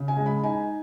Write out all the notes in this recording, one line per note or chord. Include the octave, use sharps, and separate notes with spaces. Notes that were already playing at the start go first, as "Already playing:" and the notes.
Already playing: C#3
G#5
G#3
B5
D#4 G#5